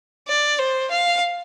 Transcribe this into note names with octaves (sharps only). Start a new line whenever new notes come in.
D5
C5
F5